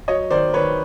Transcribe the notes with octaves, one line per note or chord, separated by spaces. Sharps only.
F#3 C#5 D#5
D#3 C5 D5
D#3 B4 C#5